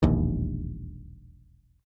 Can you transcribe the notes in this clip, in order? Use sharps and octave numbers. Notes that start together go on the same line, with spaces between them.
E1 A#1 D#2